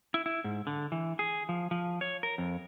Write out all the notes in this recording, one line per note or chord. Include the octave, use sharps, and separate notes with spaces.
E4
E4
G#2
D3
E3
G#4
F3
F3
C#5
A#4
F2